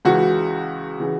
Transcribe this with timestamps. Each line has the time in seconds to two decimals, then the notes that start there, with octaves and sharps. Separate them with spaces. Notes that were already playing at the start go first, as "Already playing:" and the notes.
0.05 C#2 C#3 E3 F#4
1.00 C#3 E3